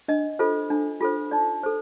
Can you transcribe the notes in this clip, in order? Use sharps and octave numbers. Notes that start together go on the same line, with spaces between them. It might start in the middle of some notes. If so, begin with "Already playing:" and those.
D4 D#5
F4 A4 C5
D4
F4 A4 C5
D#4 D5
A4 C5